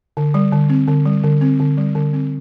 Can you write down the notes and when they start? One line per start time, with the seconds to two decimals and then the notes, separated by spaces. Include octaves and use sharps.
0.17 D3
0.34 G3
0.52 D3
0.70 C4
0.88 D3
1.06 G3
1.24 D3
1.41 C4
1.60 D3
1.77 G3
1.95 D3
2.13 C4